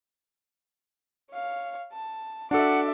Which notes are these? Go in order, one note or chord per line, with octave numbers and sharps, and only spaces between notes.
C#5 F5
A5
D4 F#4 A4 E5 F#5 D6